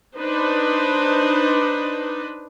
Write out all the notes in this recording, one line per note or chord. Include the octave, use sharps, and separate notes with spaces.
D4 D#4 B4 C5